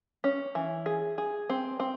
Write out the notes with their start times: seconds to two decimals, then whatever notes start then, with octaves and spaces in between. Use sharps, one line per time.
0.24 C#4
0.55 E3
0.86 G#4
1.18 G#4
1.49 C4
1.80 C4